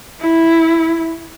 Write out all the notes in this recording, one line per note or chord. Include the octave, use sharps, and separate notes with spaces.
E4